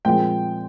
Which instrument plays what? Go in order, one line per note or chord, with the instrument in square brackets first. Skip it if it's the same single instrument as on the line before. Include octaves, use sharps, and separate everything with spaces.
[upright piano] A#2 F3 G#3 C4 G5